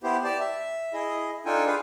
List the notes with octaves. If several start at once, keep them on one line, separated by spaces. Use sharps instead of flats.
B3 E4 G4 C5
G4 D5 A5
E5
E4 G#4 D#5
D4 D#4 F4 A4 G5 G#5
F4 G#4 B4 F5